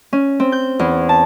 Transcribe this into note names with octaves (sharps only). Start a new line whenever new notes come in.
C#4
C4
G6
E2
A5